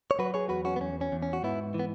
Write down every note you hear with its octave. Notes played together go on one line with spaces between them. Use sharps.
C#5
F#3 F#4 B4
G#4 C#5
E2 F#4 B4
C#4 F#4
B3
E2 C#4
C#4
E2
C#4
F#4
G#2 B3 E4
E3
B3